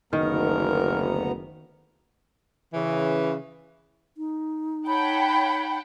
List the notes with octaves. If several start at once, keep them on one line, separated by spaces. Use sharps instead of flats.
F#1 D2 D#3 B3 A#4 A#5
C#3 E3
D#4
C#5 F#5 G5 A5 B5